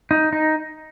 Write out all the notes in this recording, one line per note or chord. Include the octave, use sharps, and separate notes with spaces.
D#4
D#4